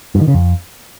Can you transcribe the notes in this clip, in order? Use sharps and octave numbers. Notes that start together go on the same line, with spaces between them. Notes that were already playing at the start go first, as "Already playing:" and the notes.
G2
D#3
C#3
F2